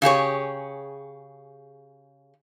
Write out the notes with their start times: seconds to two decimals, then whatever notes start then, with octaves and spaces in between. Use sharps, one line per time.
0.02 C#3 G4 G#4 C#5